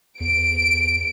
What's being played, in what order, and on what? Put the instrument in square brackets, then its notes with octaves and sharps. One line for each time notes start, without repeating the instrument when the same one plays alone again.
[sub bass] E2 [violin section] D7